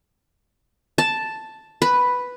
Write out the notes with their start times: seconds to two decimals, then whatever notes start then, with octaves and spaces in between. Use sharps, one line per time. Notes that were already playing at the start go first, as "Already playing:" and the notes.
0.98 A5
1.82 B4